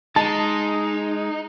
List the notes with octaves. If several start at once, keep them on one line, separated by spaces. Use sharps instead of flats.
G#3 D#4 A5